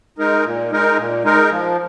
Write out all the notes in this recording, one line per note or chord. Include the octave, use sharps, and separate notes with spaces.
G#3 D#4 A#4
A#2
G#3 D#4 A#4
A#2
G#3 D#4 A#4
F3